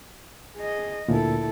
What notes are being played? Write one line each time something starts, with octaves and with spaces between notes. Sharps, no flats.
G#4 D#5
D2 A#2 E4 A4